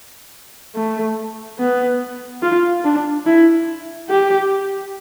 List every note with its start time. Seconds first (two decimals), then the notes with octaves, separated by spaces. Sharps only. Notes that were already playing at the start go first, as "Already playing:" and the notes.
0.75 A3
1.59 B3
2.43 F4
2.84 D4
3.26 E4
4.10 G4